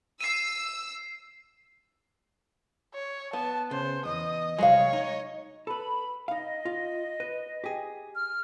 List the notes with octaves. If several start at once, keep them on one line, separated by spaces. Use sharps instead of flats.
E6 C7 D#7
C#5
B3 A5
C#3 C5
E2 D#5 D#6
C2 F2 F#3 G#3 C#5 F5
D#4 D#5
A4 B4 B5
D#4 D#5 F5
F4
B4
G4 G#4
F6